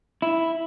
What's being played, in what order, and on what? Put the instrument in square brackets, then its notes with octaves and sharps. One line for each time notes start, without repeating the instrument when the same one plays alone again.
[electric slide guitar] E4